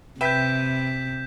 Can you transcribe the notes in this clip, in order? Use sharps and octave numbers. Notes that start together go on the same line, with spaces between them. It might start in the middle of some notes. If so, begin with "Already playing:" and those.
C3 B4 E5 G5 G6 B6 E7